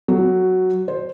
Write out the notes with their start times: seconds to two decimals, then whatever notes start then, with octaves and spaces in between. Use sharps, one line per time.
0.08 F#3
0.88 C5